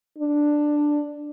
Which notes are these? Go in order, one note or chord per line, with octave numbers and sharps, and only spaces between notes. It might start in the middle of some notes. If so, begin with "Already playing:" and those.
D4